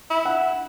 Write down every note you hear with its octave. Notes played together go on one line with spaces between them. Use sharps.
E4
F#5